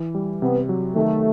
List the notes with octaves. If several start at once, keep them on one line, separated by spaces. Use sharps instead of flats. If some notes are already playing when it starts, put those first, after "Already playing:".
Already playing: E3
G3
C3 B3
F#3
D#3 A3